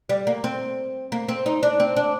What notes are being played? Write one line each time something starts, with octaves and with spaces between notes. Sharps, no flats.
G3
A#3
C4
A#3
C4
D#4
D4
C4
D4